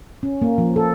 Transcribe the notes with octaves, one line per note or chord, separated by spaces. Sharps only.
C#4
A#3
F3
A4